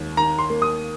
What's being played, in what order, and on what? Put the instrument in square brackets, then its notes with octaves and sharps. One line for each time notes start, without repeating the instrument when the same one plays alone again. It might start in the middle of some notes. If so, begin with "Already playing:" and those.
Already playing: [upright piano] D#2
[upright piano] D#3 [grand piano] A#5
[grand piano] C6
[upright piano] A#3
[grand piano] D#6